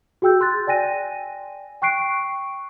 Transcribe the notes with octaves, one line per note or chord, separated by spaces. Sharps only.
F#4 G#4 G5 E6 G6
C6 F#6 A6
D5 G5 G#5 A#6 D#7
G5 C#6 F#6 C7 D7